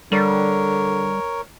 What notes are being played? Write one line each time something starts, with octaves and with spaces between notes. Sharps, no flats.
D3 G3 A#4 C#5